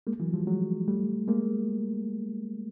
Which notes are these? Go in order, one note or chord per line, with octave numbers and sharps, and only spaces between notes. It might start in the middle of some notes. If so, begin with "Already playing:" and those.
G#3 A#3
E3 F#3
F3 G3
F#3 G#3
G3 A3
G#3 A#3